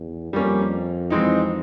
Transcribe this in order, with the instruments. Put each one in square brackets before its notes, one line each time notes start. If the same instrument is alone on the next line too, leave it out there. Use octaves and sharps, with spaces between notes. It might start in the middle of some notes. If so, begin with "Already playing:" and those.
Already playing: [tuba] E2
[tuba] F2 [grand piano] G3 A#3 C#4
[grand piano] E3 G#3 C4 D#4